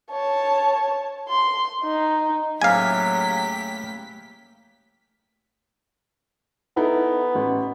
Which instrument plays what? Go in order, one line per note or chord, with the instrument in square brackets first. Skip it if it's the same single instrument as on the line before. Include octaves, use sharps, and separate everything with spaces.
[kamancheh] C#5 A5
C6
D#4
[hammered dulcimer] A2 C#3 A#3 [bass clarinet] F#3 [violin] G4 B6 [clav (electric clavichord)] F5 G#5
[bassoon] B3 [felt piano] D#4 E4 A4
[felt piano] A1